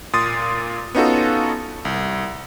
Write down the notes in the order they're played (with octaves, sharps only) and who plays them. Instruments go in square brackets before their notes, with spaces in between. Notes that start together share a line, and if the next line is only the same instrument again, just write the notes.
[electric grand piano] A#2 C6 D#6 A6
B3 C#4 D#4 F4 F#4 A4
C2